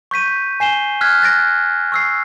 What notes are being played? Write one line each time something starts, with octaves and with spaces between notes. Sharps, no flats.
C#6 G6 B6 D#7
G#5 C7 E7 G7
F6 F#6 G#6 B6
F#6 A6 A#6 D7
C#6 E6 C7